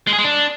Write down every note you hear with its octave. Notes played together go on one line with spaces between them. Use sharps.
G#3
G#4
G#3
D4